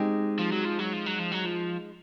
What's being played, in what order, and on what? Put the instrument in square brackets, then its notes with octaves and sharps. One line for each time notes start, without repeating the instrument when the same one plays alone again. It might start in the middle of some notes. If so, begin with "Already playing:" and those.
Already playing: [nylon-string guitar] G#3 C4 D#4 G4
[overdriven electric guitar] F3
F#3
F3
F#3
F3
F#3
F3
F#3
F3